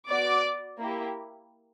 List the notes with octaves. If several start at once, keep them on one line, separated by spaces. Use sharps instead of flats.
B3 F#4 D5 D6
A#3 E4 G4